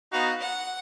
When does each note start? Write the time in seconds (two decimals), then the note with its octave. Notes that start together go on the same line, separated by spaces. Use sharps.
0.12 B3 D#4 F#4 F5
0.41 F#5